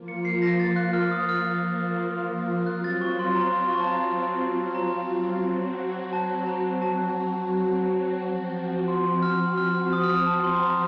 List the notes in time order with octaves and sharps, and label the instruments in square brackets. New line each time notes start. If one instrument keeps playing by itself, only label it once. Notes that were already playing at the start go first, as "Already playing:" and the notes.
Already playing: [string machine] F3 A#3 F4
[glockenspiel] C#7
C7
A#6
A6
F#6
F6
D#6
F6
[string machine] F#3 C4 F4 [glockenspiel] F#6
[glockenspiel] A6
C#6
C6
A#5
C6
C#6
A5
A#5
A#5
[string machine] F#3 C4 F#4
[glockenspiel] A5
A#5
A5
[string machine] F3 C4 F#4
[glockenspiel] C6
F6
F6
F6
D#6
F6
D#6
A5
C6
A#5